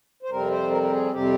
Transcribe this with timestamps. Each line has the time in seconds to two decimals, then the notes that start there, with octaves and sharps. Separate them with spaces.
0.23 C5
0.30 F2 C3 G3 C4 A#4
0.51 C5
0.71 A#4
0.83 A#4
0.91 G#4
1.12 F2 C3 G3 C4 G4